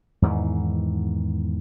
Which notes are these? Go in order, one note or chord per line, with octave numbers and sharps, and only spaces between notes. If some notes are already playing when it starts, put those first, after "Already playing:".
E2 G#2 D#3 E3